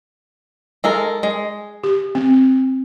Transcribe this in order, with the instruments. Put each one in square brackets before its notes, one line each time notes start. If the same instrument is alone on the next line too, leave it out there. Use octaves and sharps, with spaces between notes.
[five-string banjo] G#3 A4 A#4
G#3
[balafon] G4
C4